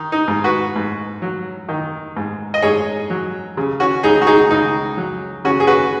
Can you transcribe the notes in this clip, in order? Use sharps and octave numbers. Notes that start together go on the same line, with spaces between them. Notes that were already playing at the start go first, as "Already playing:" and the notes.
Already playing: D#3 D#4
D#4
G#2
F#4 B4
G#2
F#3
D#3
G#2
D#5
G#2 G#4 C#5
F#3
C#3
C#4 F#4
C#2 D#4 G#4
F#4
D#4 G#4
C#2 D#4
F#3
C#3 C#4 F#4
G#4
F#4 B4